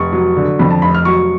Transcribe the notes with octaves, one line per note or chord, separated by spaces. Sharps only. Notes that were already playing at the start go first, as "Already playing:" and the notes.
Already playing: F1 C#6
F#3
D3
F2 B5
A5
F1 B5
F6
F#3 C#6